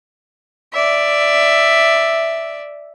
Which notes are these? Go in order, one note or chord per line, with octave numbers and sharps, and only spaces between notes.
D5 E5